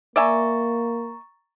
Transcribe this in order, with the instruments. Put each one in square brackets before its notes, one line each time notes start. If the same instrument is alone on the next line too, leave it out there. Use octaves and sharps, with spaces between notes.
[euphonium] A#3 [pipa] D5 E5 G#5 [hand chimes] A#5 C#6 A6